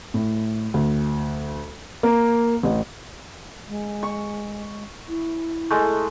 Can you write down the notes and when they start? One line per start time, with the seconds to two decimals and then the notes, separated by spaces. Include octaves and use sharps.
0.14 A2
0.74 D2
2.03 A#3
2.63 A1
3.68 G#3
4.03 C#6
5.09 E4
5.71 G#3 A3